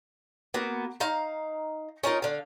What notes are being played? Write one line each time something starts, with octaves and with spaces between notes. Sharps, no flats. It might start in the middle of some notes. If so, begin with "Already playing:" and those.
A#3 B3 F#4
D#4 F5 A#5
C#4 D#4 F4 A#4
D3 F5